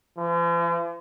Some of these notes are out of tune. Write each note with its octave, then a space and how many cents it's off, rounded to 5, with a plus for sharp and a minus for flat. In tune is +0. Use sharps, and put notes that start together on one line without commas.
F3 -45